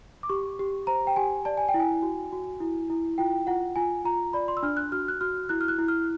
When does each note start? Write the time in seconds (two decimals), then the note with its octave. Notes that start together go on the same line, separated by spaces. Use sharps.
0.23 D6
0.29 G4 C#6
0.59 G4
0.87 C5 A#5
1.07 G5
1.16 G4 G#5
1.45 D5 A5
1.57 G#5
1.68 G5
1.74 E4
1.80 G#5
2.02 F#4
2.32 F#4
2.60 E4
2.90 E4
3.18 F4 G5
3.47 F4 F#5
3.76 F4 G#5
4.05 F4 A#5
4.33 D5 B5
4.48 C6
4.57 E6
4.63 D4 F6
4.77 F#6
4.92 F#4 F6
5.08 F#6
5.21 F#4 F6
5.49 E4 F#6
5.61 F6
5.68 F#6
5.79 E4
5.88 F6